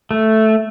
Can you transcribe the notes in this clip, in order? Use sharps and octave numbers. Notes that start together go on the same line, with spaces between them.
A3